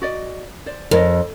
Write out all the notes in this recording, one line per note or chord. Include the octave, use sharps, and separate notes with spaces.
F#4 D5 D#5
C5 D5
F2 A#4 C#5 D#5